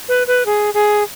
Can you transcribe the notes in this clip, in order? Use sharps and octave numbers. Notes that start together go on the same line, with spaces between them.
B4
B4
G#4
G#4